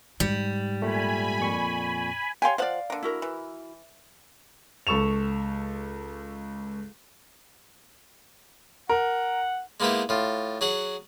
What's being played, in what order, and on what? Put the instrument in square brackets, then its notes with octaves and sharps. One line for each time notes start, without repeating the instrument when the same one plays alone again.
[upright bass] G#2 [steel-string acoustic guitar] G3
[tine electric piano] A#2 A3 [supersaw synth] G#5 B5
[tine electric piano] F2 A#2 C#6
[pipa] G4 G5 C6 [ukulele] C#5 F5 G#5
[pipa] F3 C5 F#5 [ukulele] D5 F5
[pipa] D3 A#3
[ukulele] E4 F#4 A#4
[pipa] E3
[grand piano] C#2 A4 C#6 E7 F7
[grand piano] A#4 [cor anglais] F#5
[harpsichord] G#3 A#3 B3 D#4 E4 G4
A2 F4
F#3 G#4 F#5